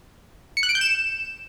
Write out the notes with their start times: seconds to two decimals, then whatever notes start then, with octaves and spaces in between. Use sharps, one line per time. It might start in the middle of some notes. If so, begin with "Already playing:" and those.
0.57 C#7
0.63 F#6
0.69 D7
0.75 G6
0.81 E7